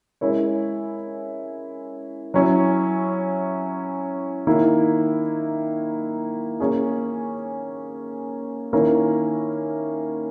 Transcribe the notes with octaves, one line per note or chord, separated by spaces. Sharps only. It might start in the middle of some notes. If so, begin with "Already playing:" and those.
G#3 C#4 E4 A#4 C#5
F#3 C#4 E4
D#3 A#3 E4
A#3 C#4 G#4
D#3 A#3 C#4 E4 A#4